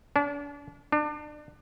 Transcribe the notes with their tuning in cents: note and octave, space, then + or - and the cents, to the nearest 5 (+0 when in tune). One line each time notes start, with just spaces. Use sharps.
D4 -40
D4 +30